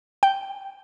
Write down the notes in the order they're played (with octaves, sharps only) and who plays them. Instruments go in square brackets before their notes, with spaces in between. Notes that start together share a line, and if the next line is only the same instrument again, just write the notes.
[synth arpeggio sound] G5